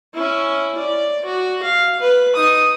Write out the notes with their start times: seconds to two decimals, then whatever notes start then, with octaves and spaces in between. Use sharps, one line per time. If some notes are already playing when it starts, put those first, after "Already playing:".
0.14 C#4 E4
0.78 D5
1.25 F#4
1.63 F5
2.00 B4
2.35 D#4 D#6